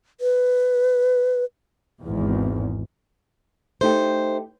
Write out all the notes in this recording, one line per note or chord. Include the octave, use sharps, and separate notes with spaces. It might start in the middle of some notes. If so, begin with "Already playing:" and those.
B4
G#1 E2
A3 D#4 G4 C5